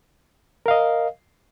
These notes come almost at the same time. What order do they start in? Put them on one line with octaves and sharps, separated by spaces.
A#4 F5 D#5